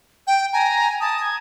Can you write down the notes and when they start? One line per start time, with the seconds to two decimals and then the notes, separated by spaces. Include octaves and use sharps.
0.27 G5
0.53 G#5 A#5
1.00 A5 D#6
1.21 G#6